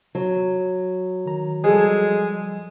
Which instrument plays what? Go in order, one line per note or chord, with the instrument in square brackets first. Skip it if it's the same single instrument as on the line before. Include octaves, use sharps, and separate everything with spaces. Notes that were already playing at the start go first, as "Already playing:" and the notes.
[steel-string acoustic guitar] F#3
[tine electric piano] D#3 A#5
[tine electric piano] F3 G3 [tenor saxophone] G#3 [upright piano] G#4 A4